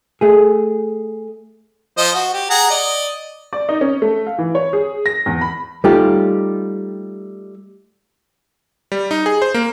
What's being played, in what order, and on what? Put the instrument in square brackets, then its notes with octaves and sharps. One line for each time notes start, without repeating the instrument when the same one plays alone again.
[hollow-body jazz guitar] A3 G#4
[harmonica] F3 C5 D#5
F#4
G4
G#4 F#5 A#5
D5 D#5
[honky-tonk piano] D5
D#4
C#4
A3
F5
E3
C#5
G#4
A#6
E2
B5
[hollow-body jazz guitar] G3 A3 D#4 F4 G4
[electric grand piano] G3
D#4
G#4
C5
A#3